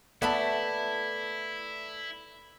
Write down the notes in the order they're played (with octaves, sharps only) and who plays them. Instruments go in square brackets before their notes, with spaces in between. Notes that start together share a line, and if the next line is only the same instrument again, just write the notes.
[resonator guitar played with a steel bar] A3 [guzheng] B3 A4 B5 [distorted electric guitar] E4 [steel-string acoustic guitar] D5 A5